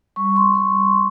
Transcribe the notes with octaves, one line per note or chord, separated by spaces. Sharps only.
G3 C#6
C6
G3
C6